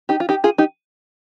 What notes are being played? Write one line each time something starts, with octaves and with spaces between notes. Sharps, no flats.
D#4 G4
F4
D#4 G4
F4 G#4
D#4 G4